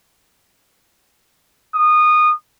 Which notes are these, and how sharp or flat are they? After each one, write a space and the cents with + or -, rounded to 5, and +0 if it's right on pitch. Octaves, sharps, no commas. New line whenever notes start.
D#6 -20